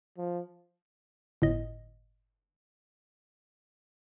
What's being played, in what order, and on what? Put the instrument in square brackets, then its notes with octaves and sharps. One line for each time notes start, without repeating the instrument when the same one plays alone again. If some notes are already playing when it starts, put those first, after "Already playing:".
[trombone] F3
[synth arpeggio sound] G1 A2 D#5